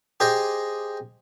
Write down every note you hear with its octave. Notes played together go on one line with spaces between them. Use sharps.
G4 G#4 C5 D#5 G5